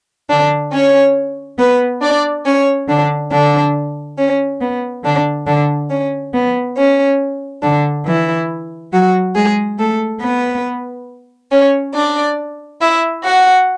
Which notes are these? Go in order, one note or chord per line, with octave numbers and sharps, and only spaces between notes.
D3 D4
C#4 C#5
B3 B4
D4 D5
C#4 C#5
D3 D4
D3 D4
C#4
B3
D3 D4
D3 D4
C#4
B3
C#4
D3 D4
E3 E4
F#3 F#4
G#3 G#4
A3 A4
B3 B4
C#4 C#5
D4 D5
E4 E5
F#4 F#5